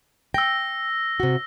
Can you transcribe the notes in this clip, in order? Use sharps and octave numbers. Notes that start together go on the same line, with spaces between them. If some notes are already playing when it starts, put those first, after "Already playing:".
G5 E6 A#6
C3 F#4